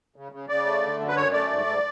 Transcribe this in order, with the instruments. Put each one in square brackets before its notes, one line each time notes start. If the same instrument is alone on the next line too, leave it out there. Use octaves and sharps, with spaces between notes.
[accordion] C#3
C#3
C#3 D5
A3
D3
F#2
B4
F#2 C#5
A3 D5
G#2
G#2